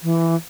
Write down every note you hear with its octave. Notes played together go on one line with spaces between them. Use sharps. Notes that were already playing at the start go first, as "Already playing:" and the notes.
E3